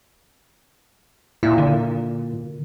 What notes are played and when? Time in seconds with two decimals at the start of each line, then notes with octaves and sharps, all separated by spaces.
1.43 A#2 E4
1.58 D3